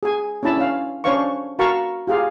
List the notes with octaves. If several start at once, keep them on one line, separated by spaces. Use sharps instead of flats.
G#4 G#5
C#4 D4 E4 A5 B5
C#4 F5
C#4 D4 C5 C#5 F5 C#6
F#4 A#4 F5 A5 B5 C#6
F4 G4 G#4 F5